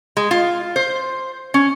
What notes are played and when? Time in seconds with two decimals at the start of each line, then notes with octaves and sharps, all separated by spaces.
0.17 G#3
0.31 F4
0.76 C5
1.54 C#4